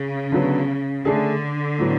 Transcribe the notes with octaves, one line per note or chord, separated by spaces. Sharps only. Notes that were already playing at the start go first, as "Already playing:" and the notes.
Already playing: C#3
D3 F#3 B3
D3 A3 D4 G#4
A2 F#3 B3